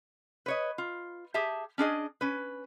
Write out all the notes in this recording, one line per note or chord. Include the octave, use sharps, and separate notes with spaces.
B4 C#5 D#5
F4
G4 G#4 E5 A5
C#4 D4 G#4 D#5
C#4 B4